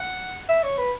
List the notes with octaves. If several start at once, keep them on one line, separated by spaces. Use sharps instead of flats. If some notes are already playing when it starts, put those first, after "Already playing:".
Already playing: F#5
E5
C#5
B4